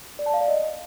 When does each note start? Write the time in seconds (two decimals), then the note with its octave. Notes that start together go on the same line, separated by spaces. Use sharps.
0.19 D5
0.26 A5
0.34 F5
0.41 D5
0.48 D#5